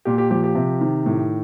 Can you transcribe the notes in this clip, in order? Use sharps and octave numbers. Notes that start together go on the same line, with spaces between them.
A#2 G4
G4
F3 G4
G4
C3
D#3
A2